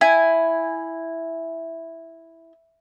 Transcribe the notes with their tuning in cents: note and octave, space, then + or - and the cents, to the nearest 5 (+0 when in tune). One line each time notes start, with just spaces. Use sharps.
E4 +0 G#5 +0